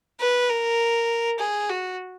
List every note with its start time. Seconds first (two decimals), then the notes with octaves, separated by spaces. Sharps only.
0.20 B4
0.49 A#4
1.39 G#4
1.69 F#4